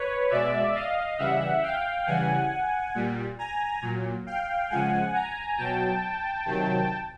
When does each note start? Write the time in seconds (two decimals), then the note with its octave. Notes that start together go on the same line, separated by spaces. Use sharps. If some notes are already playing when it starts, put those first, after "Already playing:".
Already playing: B4 C#5
0.30 B2 G#3 D5 E5
0.75 D#5 F5
1.18 C#3 E3 G3 E5 F#5
1.63 F5 G5
2.06 C#3 E3 G3 F#5 G#5
2.95 A#2 G3
3.38 G#5 A#5
3.82 A#2 F#3
4.26 F5 G5
4.70 C#3 F3 G#3 F#5 G#5
5.14 G#5 A#5
5.58 B2 F#3 G5 A5
6.46 C3 D#3 F#3